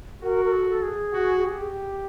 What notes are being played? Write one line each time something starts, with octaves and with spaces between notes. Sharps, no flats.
F#4 A#4
A#4
A4
A4
G#4
F#4
G4